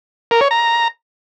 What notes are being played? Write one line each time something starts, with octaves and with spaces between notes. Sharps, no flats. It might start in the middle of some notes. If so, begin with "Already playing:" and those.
A#4
C#5
A#5